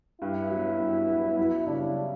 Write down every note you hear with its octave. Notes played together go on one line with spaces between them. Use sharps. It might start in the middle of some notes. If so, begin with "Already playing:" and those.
G2 E4
F#3 B3
G2
F#3 B3
F#2 E4
C#3 G3 D4